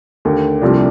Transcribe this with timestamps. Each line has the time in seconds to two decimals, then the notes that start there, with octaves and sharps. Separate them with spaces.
0.25 D#2 D3 A3
0.62 C2 C3 F3 A3 D4